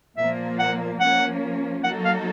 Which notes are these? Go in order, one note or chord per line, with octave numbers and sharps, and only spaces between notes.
A#2 F3 A#3 E5
F#5
F3 A#3 C#4 F#5
F#3 A#3 D#4 F#4 A4 F#5
F5